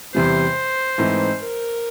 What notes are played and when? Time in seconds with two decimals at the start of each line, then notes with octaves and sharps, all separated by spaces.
0.14 E2 C3 E3 G3 C5
0.98 G#2 E3 A3 C4 D#4
1.40 A#4